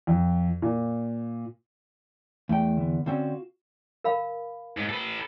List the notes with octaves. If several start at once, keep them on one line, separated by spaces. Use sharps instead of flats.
F2
A#2
E2 A3 G5
D3 B3
D3 C4 C#4 F4 F#4
A#4 F5 B5
G#2
A4 B4